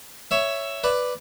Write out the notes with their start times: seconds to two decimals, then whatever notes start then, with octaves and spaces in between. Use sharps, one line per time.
0.31 C#5 E5
0.84 B4 D5